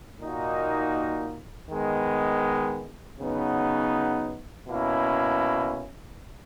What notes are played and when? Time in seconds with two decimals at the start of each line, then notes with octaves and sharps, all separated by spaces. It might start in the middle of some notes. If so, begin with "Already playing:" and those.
0.20 A#2 A#3 D#4 F#4
1.69 D#3 G#3 B3
3.18 C#3 F#3 B3 D#4
4.67 B2 A#3 C#4 E4